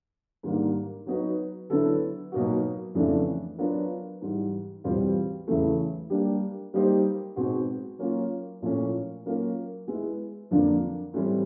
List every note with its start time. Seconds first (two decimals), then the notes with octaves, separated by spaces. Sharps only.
0.43 G#2 D#3 G3 A#3 D4
1.06 F#3 B3 D#4 F#4 B4
1.70 D3 F#3 B3 E4 A4
2.32 B2 F#3 A#3 D#4 F#4
2.95 F2 C#3 E3 A3 D4
3.58 F#3 B3 D4 F4 A#4
4.22 G#2 E3 G3
4.84 E2 B2 G3 C4 F4
5.48 E2 C#3 E3 A3
6.10 G3 A#3 D4 G4
6.74 G3 A#3 D#4 G4 C5
7.36 B2 G#3 C4 D#4 F#4
7.99 F#3 A#3 C#4 F4
8.62 A#2 F3 A3 C#4 E4
9.26 F#3 A#3 C#4 F4 A#4
9.88 G#3 B3 E4
10.51 F2 D3 F3 A#3 D4
11.14 A2 E3 G3 C4